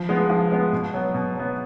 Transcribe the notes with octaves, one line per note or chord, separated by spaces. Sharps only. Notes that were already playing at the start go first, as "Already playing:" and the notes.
Already playing: F3
G#3 B3
F3
G#3 B3
B2
F#3 B3
B2
F#3 B3